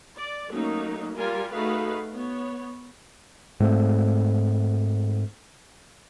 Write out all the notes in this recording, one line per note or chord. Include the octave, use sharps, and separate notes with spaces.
D5
F#3 A3 A#3 C#4 D#4
G3 F4 A#4 G#5
A3 D#4 F#4 G#4 B4 F5
B3 C#5
G#2 A3 C4